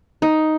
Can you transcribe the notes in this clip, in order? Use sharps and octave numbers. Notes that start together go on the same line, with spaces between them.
D#4